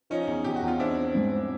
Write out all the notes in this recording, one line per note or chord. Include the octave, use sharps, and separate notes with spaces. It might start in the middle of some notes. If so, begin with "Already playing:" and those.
F3 C#4 D#4
E2
E2 G4
F#4
E2
F4
C4 D4 E4
C4
G#2
C4